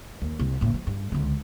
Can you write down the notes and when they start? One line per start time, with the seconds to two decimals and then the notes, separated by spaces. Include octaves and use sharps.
0.22 D#2
0.39 C2
0.61 F#1 A2
0.74 F3
0.87 G2
1.12 C#2 D3